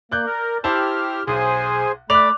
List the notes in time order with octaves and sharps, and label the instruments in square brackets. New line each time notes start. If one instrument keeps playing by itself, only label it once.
[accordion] A#3 [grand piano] D5 F#6 G6
[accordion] A#4
[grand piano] E4 C5 A5 [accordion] G4 F6
[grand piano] B1 [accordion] G#4 C5 G#5
[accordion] A3 B5 [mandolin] D5 [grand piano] F#6 F7